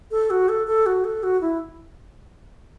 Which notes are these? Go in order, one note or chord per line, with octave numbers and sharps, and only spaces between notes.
A4
F#4
A4
A4
F#4
A4
F#4
E4